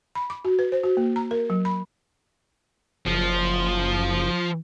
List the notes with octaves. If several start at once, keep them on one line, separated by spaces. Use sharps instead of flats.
B5
D6
F#4
B4
C5
F#4
A#3
A#5
A#4
F#3
B5
F#1 F3